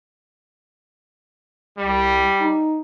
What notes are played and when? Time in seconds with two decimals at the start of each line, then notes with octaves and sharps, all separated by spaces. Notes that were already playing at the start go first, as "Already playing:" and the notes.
1.78 C2 G3
2.40 D#4